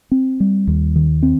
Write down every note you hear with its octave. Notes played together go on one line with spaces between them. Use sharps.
C4
G3
D#2
D#3
C4